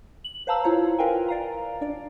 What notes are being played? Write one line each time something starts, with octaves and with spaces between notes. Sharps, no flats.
F#7
B4 C5 F5 A5 A#5 E6
E4 F4 C5 C#5 F5 A#5
F4 A#4 B4 F5 G5 G#5
D5 F5 A#5
D4 D5